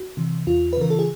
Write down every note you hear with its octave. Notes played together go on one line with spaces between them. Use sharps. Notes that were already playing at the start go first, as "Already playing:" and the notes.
Already playing: F#4
C3 E3
E2 F4
B4
C#3 E3 A#4
A4
G#4